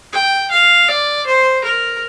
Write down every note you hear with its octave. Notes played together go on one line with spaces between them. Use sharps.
G5
F5
D5
C5
A#4